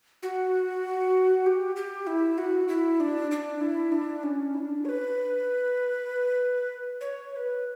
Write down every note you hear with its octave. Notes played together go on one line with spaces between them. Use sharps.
F#4
G4
G4
E4
F#4
E4
D4
D4
E4
D4
C#4
E4
D4
C#5
B4
C#5
C#5
B4